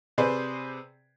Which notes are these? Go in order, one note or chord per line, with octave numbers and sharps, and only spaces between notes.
C3 G#4 B4 C5 D5